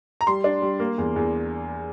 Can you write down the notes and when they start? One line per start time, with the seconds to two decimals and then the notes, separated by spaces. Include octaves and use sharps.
0.21 A#5
0.27 G3 C6
0.44 D4
0.62 G3
0.80 A#3
0.98 E2
1.16 E2